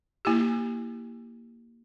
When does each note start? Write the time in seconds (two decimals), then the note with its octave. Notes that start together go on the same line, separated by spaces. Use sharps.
0.25 A#3 E4 G4